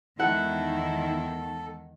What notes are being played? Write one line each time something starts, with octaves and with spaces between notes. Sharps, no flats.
E2 D#3 G#3 E4 A4 F#5